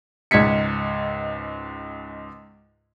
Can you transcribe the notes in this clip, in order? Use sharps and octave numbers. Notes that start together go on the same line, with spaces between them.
C#2 G#2 G#6 B6 C#7